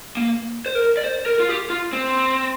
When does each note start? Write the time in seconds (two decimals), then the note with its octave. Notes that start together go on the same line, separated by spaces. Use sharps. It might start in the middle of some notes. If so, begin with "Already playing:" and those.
0.17 A#3
0.66 C5
0.75 A#4
0.97 D5
1.05 C5
1.26 A#4
1.40 F4
1.49 G4
1.70 F4
1.93 C4